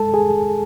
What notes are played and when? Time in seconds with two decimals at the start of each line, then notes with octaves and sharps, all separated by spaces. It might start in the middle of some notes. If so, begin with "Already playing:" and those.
Already playing: G#3 A4 A5
0.14 G#4 G#5